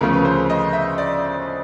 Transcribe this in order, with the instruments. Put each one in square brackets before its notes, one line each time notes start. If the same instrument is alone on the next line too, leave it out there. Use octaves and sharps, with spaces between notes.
[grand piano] D2 C#3 F3 A3 C#4 A#4
B4
C5
D#5
E5
D5